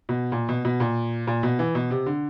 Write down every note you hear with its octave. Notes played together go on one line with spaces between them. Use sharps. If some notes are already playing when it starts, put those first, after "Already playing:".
B2
A#2
B2
B2
A#2
A#2
B2
E3
B2
C3
D3